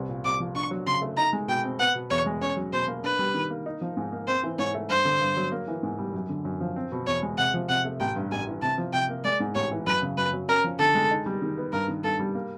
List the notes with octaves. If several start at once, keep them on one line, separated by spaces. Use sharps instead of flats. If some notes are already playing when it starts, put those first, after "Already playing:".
Already playing: C2 B3
A#2
C2 D6
F3
D4 C#6
F#3
C#3 C6
A3
D#4 A#5
G#3
B2 G5
C4
B3 F#5
B2
E2 C#5
G#3
C#4 C#5
F#3
B2 C5
A#3
D4 B4
G3
D#3
A#3
D#4
F3
G#2
A#3
C4 C5
E3
G#2 C#5
A3
G2 C5
D3
G2
F#3
A#3
E3
G#2
G3
F#2
D3
F#2
F3
C4
B2
E2 C#5
G#3
C3 F#5
F3
C3 F#5
A3
A1 G5
G2
A1 G#5
E3
C3 A5
F3
C3 G5
A#3
G#3 D5
G#2
A1 C#5
E3
F#2 B4
C#3
F#2 B4
F#3
C#4 A#4
F3
D3 A4
G#3
D#4
G3
D#3
B3
G2 A#4
D#3
G2 A4
G3
A#3